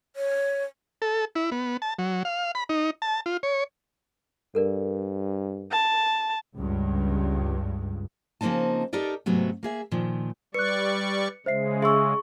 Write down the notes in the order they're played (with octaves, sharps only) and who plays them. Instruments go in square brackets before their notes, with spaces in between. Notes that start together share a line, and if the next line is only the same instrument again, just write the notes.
[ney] C#5
[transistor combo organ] A4
E4
B3
A5
F#3
F5
B5
D#4
A5
F4
C#5
[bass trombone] G2 [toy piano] A4 A#4 D5
[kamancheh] A5
[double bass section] C#2 G2
[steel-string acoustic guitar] C#3 F3 A#3 C4 D#4 A5
D#4 G4 A4 A#4 D5
G#2 C3 F#3 A3 B3
A#3 G#4 E5
A#2 D#3 F3
[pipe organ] G3 D5 C#6 [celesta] B4 F#6 [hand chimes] C#7
[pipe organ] C#3 G#3 [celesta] C5 E5 C7
[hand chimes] G#4 C#6 [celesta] E5 C6 E6